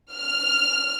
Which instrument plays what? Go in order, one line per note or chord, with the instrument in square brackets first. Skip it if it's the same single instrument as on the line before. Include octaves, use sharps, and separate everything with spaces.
[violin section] F6